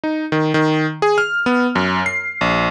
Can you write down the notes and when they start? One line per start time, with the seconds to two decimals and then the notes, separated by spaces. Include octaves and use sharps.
0.04 D#4
0.32 D#3
0.54 D#3
1.02 G#4
1.18 F6
1.46 B3
1.75 F#2
2.06 C7
2.41 A#1